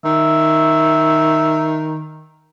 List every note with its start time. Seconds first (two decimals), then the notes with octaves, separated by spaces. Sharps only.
0.05 D#3 E5